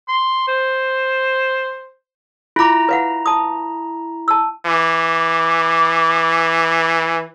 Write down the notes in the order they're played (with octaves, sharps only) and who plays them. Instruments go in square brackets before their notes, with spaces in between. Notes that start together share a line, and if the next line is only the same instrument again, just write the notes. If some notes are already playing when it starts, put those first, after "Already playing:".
[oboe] C6
C5
[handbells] E4 A#5 [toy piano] F4 D6
[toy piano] B4 F5 F#5
A5 D#6
A5 E6
[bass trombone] E3 [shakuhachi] D6